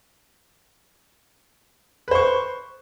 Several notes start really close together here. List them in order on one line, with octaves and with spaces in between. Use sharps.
B4 C5 C#6